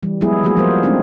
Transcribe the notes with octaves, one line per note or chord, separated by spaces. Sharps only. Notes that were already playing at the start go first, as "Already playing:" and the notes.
E3 G3
F#3 G#3 B3 E4 G#4
F3 G#3 A#3 F#4 G#4
F3 G3 B3 A#4 C5
G#3 A3 C4 D4 D#4